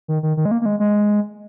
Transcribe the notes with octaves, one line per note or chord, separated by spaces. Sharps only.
D#3
D#3
D#3
G#3
A#3
A#3
G#3
G#3